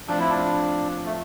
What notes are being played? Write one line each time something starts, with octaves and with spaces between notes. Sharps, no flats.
A2 F3 C4 D4 F4
E4
D4
A3